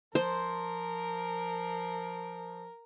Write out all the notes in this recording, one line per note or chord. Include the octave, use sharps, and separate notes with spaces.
F3 A#4 C5